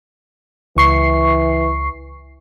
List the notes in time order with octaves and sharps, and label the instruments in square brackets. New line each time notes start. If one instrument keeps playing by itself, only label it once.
[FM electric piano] C#2 C#6 C7 [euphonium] E3